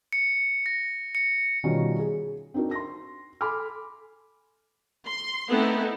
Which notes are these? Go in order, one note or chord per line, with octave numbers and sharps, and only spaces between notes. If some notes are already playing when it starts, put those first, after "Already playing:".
C#7
A#6
C#7
B2 D#3 G3 C#4 D#4 F4
G#4
C4 D4 D#4 F#4 A#4
C6 A#6
A4 G#5 B5 C6 D6 F6
C6
A3 B3 C4 D#4 E4 A4